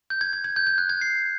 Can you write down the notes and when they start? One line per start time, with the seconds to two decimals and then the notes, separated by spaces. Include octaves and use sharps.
0.10 G6
0.21 G#6
0.33 G#6
0.44 G#6
0.56 G6
0.67 G6
0.78 F#6
0.89 G#6
1.01 C7